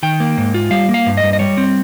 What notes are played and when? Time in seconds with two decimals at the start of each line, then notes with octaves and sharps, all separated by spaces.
0.03 D#3 G5
0.20 A#3
0.38 G#2
0.54 F4
0.71 G3 F5
0.89 A#3
0.94 F5
1.06 G2
1.17 D#5
1.23 G2
1.33 D#5
1.39 G3 C#5
1.57 C4